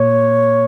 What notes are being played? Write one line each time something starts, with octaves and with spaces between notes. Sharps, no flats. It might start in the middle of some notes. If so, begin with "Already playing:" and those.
Already playing: A#2 C#5